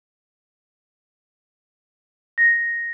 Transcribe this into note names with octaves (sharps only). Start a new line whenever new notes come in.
A#6